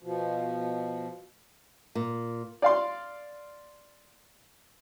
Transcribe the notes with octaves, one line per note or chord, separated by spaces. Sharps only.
B2 F3
A#2
D5 F5 C6